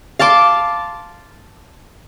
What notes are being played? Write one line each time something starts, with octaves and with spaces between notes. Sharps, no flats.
F5 A5 C6 D6